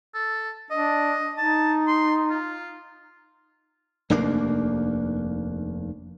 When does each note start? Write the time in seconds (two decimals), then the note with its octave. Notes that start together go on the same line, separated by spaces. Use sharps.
0.14 A4
0.71 D4 D#5
1.38 D#4 A5
1.88 C6
2.30 F4
4.10 F1 D#2 A#3 D4